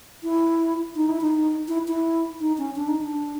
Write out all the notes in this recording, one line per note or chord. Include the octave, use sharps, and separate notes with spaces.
E4
D#4
E4
D#4
E4
E4
D#4
C#4
D4
D#4
D4